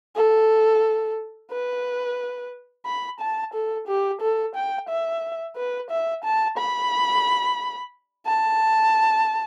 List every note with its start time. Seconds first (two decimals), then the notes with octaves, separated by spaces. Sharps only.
0.16 A4
1.51 B4
2.86 B5
3.20 A5
3.54 A4
3.88 G4
4.21 A4
4.55 G5
4.89 E5
5.56 B4
5.90 E5
6.24 A5
6.58 B5
8.27 A5